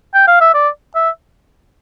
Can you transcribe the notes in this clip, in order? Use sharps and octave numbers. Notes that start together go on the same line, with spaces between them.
G5
F5
E5
D5
E5